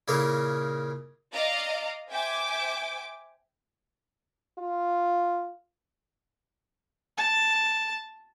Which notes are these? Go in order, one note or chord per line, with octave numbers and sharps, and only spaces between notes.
A#2 C#3 A#3 E4 G#4
D5 D#5 F5 A#5
C5 E5 G5 G#5 D6
F4
A5